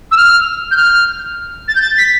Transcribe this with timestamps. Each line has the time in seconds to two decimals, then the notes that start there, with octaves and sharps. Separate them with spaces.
0.11 E6
0.17 F6
0.71 G6
0.76 F6
1.68 A6
1.75 G6
1.81 A6
1.98 B6